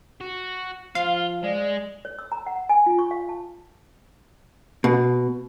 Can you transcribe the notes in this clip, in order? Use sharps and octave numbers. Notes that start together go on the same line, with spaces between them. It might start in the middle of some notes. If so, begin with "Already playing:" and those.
F#4
F3 F4 F5
G#3 D5
C#5
E6
A#5
F#5
G#5
F4
C#6
F5
A5
B2